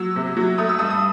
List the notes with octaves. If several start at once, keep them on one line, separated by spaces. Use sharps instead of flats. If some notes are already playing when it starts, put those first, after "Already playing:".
Already playing: F#3 E6
C3
F#3
A3 D#6
E6
G2 D#6
D#6